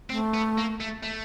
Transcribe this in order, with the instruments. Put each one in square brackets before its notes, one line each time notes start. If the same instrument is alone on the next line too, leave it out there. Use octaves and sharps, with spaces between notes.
[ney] A3 [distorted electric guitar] C4
[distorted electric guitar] B3
A#3
A3
A3